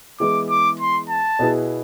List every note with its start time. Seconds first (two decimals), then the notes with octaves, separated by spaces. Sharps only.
0.20 E3 G#3 B3 E4 G#4 D6
0.50 D6
0.80 C6
1.09 A5
1.39 B2 B3 E4 G#4